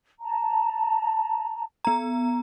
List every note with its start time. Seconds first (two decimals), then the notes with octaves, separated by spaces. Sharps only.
0.21 A5 A#5
1.85 B3 A#5